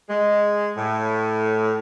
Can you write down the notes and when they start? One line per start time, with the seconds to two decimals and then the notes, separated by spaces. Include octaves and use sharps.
0.09 G#3
0.78 A2